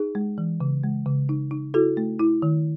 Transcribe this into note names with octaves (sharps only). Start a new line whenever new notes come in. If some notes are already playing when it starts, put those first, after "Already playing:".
Already playing: D#4 G#4
G#3
E3
C#3
G#3
C#3
D#4
D#4
E4 F#4 A4
A3
E4
D#3